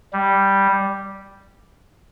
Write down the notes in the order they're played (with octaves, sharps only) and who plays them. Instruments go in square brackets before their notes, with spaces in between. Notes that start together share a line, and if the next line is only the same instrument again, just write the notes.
[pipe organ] G3